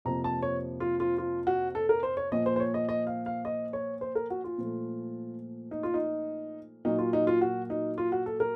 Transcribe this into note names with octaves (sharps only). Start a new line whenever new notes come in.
F2 C3 F3 A#3 A#5
A5
C#5
F4
F4
F4
F#4
A4
A#4
C5
C#5
A#2 F3 A#3 D#5
C5
C5
C#5
D#5
D#5
F5
F5
D#5
C#5
C5
A#4
F#4
F4
A#2 F3 A3
D#4
F4
D#4
A#2 F#3 A#3 D#4
F4
D#4
F4
F#4
D#4
F4
F#4
A4
A#4